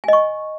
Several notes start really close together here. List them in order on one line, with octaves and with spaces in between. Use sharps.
G#5 D#5 C#6